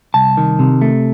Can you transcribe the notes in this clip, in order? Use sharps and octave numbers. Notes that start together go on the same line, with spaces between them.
C2 A5
D#3
C3
A3